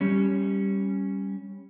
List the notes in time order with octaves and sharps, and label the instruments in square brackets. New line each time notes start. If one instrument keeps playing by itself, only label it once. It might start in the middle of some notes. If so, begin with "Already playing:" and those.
[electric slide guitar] G3 C#4